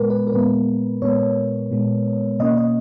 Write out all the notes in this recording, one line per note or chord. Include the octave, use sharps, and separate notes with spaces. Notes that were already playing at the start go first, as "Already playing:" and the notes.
Already playing: A#2 G#3 B3 A#4 B4
B4
A#4
A#2 G#3 B3 B4
A#2 G#3 B3 C#5
A#2 G#3 B3
B2 A#3 C#4 D#5
D#5